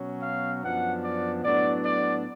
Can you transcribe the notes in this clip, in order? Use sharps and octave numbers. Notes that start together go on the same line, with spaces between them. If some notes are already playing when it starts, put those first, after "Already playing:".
Already playing: B2 F#3 C#4
F5
F#2 F3 B3 D4 F#5
D5
A2 F#3 B3 D4 D5
D5